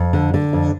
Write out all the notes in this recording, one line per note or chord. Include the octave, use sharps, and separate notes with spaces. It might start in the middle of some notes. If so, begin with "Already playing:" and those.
Already playing: F2
D3
D3
F2